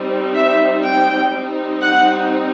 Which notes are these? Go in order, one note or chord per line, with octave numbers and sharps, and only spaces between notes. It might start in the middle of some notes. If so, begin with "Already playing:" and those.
Already playing: G3 C4 D#4
E5
G5
G3 C4 D#4
F#5